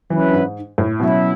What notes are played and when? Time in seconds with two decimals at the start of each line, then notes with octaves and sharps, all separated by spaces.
0.10 E3 F#3 C#4 E4 B4
0.33 G#2
0.78 A2
1.00 B2 F#3 C#4 E4